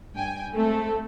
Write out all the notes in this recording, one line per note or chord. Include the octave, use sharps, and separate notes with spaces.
G2 G5 G#5
G#3 A3 C4 A4